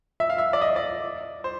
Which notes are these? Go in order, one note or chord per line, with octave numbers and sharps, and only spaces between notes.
E5
F5
E5
D5
D#5
D5
C5